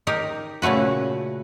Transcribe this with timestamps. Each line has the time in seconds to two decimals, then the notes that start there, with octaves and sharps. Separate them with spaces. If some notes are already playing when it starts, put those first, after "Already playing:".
0.07 D#4 G4 A#4
0.62 A#2 C#3 A3 F#4 B4